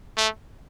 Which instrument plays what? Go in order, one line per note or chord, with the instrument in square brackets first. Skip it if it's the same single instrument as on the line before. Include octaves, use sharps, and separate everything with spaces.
[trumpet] A3